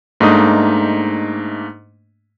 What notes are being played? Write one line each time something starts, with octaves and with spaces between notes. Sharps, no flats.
G#2 A3 A#3 D4 D#4 D#6